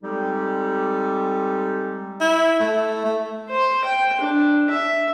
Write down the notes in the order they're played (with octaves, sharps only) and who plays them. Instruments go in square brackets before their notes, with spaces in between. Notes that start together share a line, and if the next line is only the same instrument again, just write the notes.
[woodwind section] G3 G#3 C4 D#4 G4 A4
[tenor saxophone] E4
A3
A3
[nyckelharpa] C5
G5
D4
E5